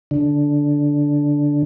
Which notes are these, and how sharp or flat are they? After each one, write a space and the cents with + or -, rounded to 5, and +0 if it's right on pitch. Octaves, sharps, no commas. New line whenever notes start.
D3 -10